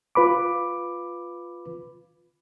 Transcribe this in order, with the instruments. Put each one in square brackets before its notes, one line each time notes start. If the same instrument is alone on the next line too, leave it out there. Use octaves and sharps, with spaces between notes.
[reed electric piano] F4 B4 B5 D6